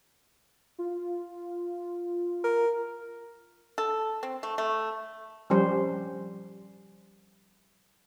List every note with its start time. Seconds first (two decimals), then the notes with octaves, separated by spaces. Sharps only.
0.78 F4
2.44 A#4
3.78 A4
4.23 C4
4.43 A3
4.58 A3
5.50 F3 G3 C#4 C5